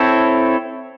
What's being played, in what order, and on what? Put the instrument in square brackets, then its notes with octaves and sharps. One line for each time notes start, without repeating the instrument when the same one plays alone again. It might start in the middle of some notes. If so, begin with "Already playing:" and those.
Already playing: [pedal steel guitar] C4 E4 A4 C#5